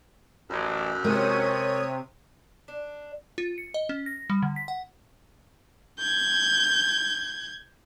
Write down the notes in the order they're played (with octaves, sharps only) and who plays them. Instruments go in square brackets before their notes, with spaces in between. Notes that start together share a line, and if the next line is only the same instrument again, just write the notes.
[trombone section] A1 [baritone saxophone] F#2
[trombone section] C3 [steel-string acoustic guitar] G#3 A#4 G5 [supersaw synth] C#5 D#6 D#7
[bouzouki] D4
[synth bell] F4
C#7
D#5
C#4
A#6
G3
D3
B6
F#5
[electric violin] G6 G#6